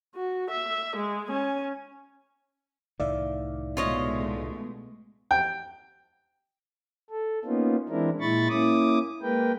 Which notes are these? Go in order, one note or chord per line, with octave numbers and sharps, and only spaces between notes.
F#4
E5
G#3
C#4 G#5
C2 A2 D#3 D5 E5 F5
B2 G#3 A3 F4 C#5 D#5
G5
A4
A#3 B3 C#4 D#4 F4
E3 G#3 C4 D4 E4 A#4
A#2 G#3 E4 B5 C#6 A6
A#3 C#4 E4 D6 D#6
G#3 A#3 A#4 B4 G5